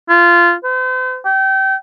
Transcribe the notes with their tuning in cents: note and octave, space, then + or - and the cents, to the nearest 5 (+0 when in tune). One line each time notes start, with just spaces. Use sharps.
F4 -15
C5 -40
G5 -30